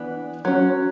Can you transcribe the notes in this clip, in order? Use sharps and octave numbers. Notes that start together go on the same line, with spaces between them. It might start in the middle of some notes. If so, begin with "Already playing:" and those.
Already playing: E3 B3 D4
F#3 C#4